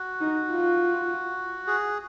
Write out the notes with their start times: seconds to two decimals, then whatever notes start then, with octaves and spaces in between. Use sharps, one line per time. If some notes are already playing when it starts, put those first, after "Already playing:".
Already playing: F#4
0.21 D#4
0.51 F4
1.67 G#4